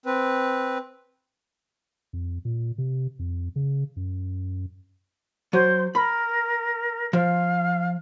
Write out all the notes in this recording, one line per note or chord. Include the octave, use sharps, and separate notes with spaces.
C4 B4
F2
A#2
C3
F2
C#3
F#2
F#3 C5
A#4 B5
F3 F5